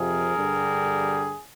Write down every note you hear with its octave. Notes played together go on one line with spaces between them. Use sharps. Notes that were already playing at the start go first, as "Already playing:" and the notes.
Already playing: F2 C3 F3 G#4 A#4
G2 D3 G3